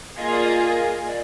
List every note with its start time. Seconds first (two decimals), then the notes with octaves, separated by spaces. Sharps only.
0.17 A#3 F4 G#4 D#5
0.31 D5
0.44 D#5
1.07 D5